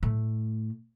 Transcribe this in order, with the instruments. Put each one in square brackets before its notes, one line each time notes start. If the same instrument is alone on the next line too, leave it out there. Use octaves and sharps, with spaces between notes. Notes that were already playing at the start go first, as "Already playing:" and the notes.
[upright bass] A2 A3